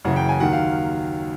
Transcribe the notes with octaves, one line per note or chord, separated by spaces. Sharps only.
F#1 F#2 C#3 E3 F#5
G5
G#5
D#2 D#3 F#3 F#5
F5